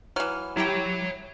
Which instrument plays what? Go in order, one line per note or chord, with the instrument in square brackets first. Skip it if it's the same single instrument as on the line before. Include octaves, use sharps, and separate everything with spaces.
[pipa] E3 F#3 [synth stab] F6
[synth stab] E4 G4 G5 [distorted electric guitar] C#5 A#5